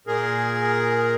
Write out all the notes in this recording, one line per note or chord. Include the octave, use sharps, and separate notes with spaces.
A#2 G#4 A#4